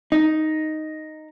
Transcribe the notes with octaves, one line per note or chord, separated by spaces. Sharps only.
D#4